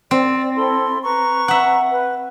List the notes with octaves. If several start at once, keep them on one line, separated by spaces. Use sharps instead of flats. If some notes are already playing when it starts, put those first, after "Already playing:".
C4 D5
E4 A4 C6
B4 A#5 C#6
E5 F#5
B4